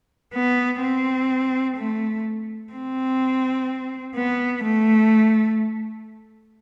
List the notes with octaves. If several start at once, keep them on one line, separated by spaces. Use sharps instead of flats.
B3
C4
A3
C4
B3
A3